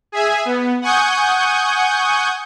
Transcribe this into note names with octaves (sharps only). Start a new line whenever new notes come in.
G#4 E5 G#5
B3
F#5 G#5 C#6 D#6 G6